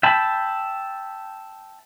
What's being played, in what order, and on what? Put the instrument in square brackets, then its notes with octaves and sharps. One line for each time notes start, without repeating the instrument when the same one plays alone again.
[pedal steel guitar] E5 G5 A5 B5